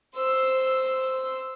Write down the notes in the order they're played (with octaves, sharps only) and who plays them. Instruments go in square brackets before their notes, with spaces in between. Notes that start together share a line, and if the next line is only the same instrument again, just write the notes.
[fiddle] C5 E6